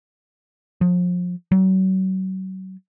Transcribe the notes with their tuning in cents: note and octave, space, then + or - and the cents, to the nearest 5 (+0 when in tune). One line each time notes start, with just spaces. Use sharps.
F3 +35
F#3 +35